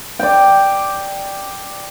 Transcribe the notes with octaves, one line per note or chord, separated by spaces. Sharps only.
D5 G5